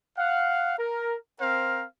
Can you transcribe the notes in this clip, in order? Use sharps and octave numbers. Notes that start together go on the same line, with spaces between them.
F5 F#5
A#4
C4 A#4 C5 F5